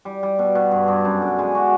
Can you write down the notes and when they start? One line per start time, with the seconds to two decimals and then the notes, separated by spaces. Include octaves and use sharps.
0.05 G3
0.23 G3
0.39 B2
0.55 B2
0.71 G2
0.88 G2
1.05 F#2
1.22 D3
1.39 G#3
1.55 F#4